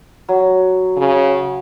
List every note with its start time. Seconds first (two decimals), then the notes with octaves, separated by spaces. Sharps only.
0.29 F#3
0.97 C#3